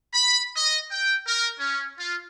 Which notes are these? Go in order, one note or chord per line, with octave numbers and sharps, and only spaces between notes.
B5
D#5
G5
A#4
C#4
F4